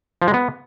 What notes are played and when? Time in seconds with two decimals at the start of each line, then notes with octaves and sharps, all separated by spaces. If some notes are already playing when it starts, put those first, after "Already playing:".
0.22 F3
0.28 G#3
0.34 B3